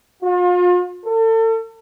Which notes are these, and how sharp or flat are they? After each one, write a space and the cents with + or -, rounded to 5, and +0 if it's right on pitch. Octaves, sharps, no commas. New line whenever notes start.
F4 +40
A4 +35